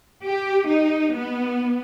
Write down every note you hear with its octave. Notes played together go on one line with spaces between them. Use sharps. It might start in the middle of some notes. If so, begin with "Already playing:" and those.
G4
D#4
B3